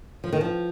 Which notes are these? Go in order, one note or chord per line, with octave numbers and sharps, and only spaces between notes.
F3
D#3
F3